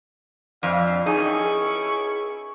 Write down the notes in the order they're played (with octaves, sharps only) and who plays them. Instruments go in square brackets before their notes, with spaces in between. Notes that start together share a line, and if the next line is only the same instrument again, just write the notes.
[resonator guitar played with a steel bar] F2 [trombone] D4 [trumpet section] F4 E5 F5
[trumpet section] C#4 E4 C#6 [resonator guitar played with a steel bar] D#4 [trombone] G#4
[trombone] G#4